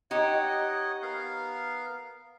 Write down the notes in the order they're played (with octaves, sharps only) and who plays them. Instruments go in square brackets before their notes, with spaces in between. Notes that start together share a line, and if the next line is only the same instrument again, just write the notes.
[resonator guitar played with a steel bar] D#4 G4 [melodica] C#5 D#5 F#5
[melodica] B3 A#4 F5